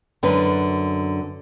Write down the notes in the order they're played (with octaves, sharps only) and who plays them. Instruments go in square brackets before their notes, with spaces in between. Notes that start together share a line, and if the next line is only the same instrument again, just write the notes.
[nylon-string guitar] F#2 D3 B4